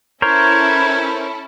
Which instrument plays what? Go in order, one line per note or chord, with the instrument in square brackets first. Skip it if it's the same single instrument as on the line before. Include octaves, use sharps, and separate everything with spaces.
[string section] C#4 E4 A4 [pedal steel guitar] A#4 C5 C#5 [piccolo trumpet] G#6